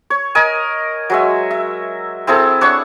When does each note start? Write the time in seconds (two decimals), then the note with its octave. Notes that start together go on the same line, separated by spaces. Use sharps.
0.10 C#5
0.35 A#4 D#5 G#5
1.10 F#3 G#3 E5
1.51 E5
2.27 C4 E4 G#4 A4
2.61 D4 C#5 F#5 C#6